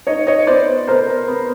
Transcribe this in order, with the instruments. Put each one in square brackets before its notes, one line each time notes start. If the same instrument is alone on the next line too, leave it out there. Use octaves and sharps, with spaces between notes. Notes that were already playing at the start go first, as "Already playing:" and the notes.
[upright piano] D#4 C#5 D#5
C#5 D#5
B3 C5 D5
B3 A#4 C5
B3